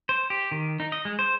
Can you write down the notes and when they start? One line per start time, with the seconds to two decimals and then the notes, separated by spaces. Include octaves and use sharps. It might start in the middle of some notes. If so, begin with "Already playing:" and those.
0.09 C5
0.30 G4
0.52 D#3
0.80 D#4
0.92 D#5
1.05 G#3
1.19 C5